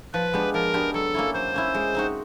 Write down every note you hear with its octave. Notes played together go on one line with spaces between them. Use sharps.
F3 B4
G#3 B3 D4 G4
F3 A#4
G#3 B3 D4 G4
F#3 A4
A#3 C#4 E4
F#3 C5
A#3 C#4 E4
G#3
C4 D#4 F#4